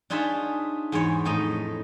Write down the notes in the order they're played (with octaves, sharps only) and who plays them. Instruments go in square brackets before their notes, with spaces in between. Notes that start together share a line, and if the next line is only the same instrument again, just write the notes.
[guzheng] D4 D#4 F4 G#4 C#5 E5
E2 G#2 E4 C#5
F2 A2 D#4 D#5